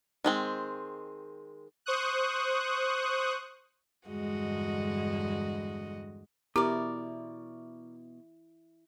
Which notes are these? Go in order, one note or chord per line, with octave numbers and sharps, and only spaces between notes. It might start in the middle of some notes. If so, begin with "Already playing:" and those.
D#3 G#3 C4
C5 C#6 D#6 F#6
E2 G2 D3 G#3 F#4 D#5
B2 E4 G4 A#4 D5